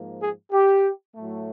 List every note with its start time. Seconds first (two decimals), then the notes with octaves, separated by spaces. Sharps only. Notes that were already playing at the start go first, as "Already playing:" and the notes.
Already playing: G#2 F3 A#3
0.21 G#4
0.52 G4
1.15 A2 F#3 A3